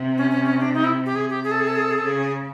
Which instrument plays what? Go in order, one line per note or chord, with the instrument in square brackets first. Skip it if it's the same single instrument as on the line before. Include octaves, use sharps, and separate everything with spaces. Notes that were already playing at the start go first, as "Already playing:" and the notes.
Already playing: [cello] C3
[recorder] C#4
C#4
C#4
D4
D#4
E4
G4
[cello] C3 [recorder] G#4
[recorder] G4
G#4
A4
G#4
A4
G#4
A4
G#4
A4
[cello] C#3 [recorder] G#4